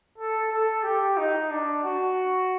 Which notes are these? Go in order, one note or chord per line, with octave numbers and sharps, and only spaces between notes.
A4
A4
G4
D#4
D4
F#4